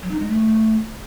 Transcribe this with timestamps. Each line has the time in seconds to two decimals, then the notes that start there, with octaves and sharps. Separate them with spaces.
0.02 F#3
0.11 D#4
0.20 G#3
0.28 A3